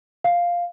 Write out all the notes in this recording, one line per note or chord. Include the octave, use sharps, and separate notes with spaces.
F5